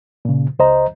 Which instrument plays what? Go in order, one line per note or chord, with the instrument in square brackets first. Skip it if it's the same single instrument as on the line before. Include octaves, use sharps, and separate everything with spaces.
[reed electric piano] A#2 C#3
C#2 C5 D#5 A#5